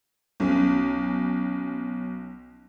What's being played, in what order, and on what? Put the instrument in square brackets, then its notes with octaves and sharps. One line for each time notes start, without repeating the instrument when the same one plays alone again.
[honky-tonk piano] B1 C#4